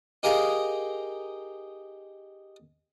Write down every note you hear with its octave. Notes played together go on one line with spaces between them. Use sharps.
D#4 G4 G#4 A#4 F5